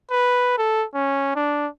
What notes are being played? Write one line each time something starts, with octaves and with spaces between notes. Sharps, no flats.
B4
A4
C#4
D4